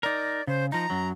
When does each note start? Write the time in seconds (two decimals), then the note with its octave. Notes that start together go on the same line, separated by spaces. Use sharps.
0.03 D#4 A#4 D5
0.47 C#3 C5
0.72 F3 D#4 A#5
0.90 F#2 F#3